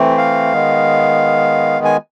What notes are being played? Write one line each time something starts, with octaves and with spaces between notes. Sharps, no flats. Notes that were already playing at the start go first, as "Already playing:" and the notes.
Already playing: E3 A3 C4
F5
D#3 G#3 B3
G#5